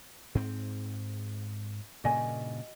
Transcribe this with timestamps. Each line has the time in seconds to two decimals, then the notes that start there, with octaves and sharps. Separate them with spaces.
0.35 G#2 C4
2.04 G2 A#2 C#3 F#4 D#5 G#5